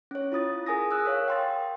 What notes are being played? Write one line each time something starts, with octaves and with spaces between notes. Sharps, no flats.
C#4 C#5
E4 F4 D#6 A6
G#4 A#4 G#5 D#6 A#6
D#6 E6 F#6
A#4 C#5 F5
G5 C6 A6